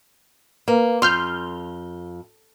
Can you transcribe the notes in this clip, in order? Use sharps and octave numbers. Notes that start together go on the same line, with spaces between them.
A#3 B4 F5
F2 C6 F6 G6 G7